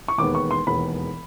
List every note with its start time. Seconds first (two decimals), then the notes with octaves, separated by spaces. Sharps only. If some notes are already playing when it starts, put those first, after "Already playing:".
0.08 C#6
0.18 E1 D#2 D#3 G#3 B3 D6
0.35 C#6
0.51 C6
0.67 E1 D#2 D#3 G#3 B3 B5